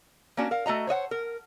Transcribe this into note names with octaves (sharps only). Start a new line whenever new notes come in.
A#3 C#4 D4 F#4
A#4 F5
A3 F#4 D#5 A#5
C5 C#5 D#5 F#5
A#4